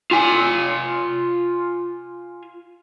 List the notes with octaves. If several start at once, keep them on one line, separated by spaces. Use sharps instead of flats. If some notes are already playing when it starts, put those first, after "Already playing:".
F4 G#5